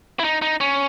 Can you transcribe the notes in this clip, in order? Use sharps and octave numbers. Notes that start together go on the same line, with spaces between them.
E4
D#4
D#4
C#4